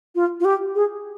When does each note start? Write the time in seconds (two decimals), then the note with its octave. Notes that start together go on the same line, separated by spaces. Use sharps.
0.15 F4
0.40 F4
0.45 G4
0.75 G#4